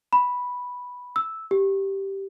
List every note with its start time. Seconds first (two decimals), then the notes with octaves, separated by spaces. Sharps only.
0.13 B5
1.16 E6
1.51 G4